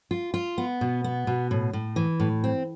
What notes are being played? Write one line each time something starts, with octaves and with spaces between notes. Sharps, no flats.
F4
F4
B3
B2
B3
B2
A2
A2
E3
A2
C4